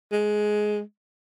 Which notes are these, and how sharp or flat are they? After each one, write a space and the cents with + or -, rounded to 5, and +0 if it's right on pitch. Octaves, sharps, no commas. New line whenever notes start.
G#3 +15